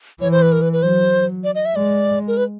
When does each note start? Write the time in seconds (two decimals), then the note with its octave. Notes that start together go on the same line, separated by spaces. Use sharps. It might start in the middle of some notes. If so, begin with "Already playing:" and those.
0.21 E3 C#5
0.32 C5
0.42 B4
0.52 A#4
0.62 B4
0.73 B4
0.82 F#3 C5
1.44 D5
1.55 D#5
1.65 E5
1.76 G#3 D5
2.28 A#4
2.37 B4